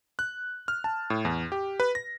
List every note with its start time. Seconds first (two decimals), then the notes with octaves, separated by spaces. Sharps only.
0.19 F#6
0.68 F6
0.84 A5
1.10 A2
1.25 E2
1.52 G4
1.80 B4
1.95 A#6